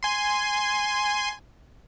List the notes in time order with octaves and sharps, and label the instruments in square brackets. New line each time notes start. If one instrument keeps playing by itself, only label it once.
[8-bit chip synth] G#5 C6